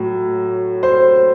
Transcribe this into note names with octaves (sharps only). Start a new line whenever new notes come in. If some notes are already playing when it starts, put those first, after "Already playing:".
Already playing: A2 F#3
C5